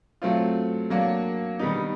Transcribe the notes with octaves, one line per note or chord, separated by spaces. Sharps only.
F#3 A3 C4 F4
F#3 A#3 D4 F#4
D#3 G3 B3 D#4